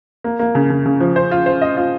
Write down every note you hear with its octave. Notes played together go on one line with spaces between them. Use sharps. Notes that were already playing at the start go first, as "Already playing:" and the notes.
A#3
A#3
C#3
C#3
C#3
F3
C5
F4
C5
D#5
F4